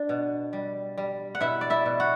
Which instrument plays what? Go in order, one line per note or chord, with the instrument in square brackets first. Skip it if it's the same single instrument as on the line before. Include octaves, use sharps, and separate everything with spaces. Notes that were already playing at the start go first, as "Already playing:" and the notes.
Already playing: [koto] D4 D5
B2
G3
G3
F#5
B2 E4 E5
D5
E4 E5
B2
F#4 F#5